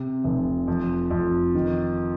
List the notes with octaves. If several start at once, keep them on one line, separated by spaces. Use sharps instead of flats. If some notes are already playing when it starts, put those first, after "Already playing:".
Already playing: C3
F1
F2
F2
D#3